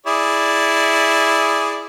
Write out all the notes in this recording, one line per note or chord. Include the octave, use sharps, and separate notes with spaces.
E4 G#4 D5